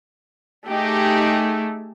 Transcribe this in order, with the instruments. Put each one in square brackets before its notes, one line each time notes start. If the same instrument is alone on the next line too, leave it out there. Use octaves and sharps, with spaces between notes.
[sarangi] A3 [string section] D#4 G4 G#4